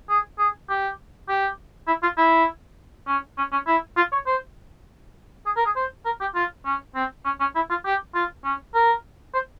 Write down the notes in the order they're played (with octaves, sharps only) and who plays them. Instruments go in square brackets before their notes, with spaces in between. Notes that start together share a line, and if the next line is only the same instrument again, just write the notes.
[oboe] G#4
G#4
G4
G4
E4
F4
E4
C#4
C#4
C#4
E4
F4
C#5
C5
G#4
A#4
G#4
C5
A#4
G4
F4
C#4
C4
C#4
C#4
E4
F4
G4
F4
C#4
A#4
C5